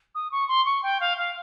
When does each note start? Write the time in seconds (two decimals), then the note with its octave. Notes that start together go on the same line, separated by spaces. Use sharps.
0.15 D#6
0.31 C#6
0.48 C6
0.65 C#6
0.83 G5
1.00 F5
1.17 F5